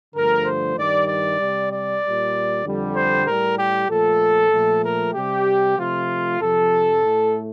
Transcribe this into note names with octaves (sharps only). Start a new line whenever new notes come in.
G2 D3 F3 A3 A#4
C5
G2 D#3 G3 D5
D5
C3 G3
D5
A#2 G3
F2 D3 G3
C5
A2 G3 A#4
G4
A#2 F3 A3 A4
A#2 F3 A3
A#4
C3 G3 G4
C3 F3 A3 F4
F2 C3 F3 A4
A2 A3